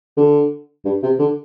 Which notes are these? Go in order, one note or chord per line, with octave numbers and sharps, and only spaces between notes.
D3
G2
C3
D3